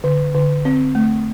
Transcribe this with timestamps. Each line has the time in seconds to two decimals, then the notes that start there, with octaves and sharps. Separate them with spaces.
0.04 D3
0.35 D3
0.65 C4
0.95 A3